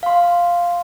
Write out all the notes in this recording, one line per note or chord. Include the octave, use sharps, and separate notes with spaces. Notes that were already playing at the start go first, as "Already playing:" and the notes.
F5 C6